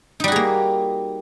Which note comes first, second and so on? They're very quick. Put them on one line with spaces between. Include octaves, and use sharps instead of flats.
D#4 G3 F#4 G#4 A#3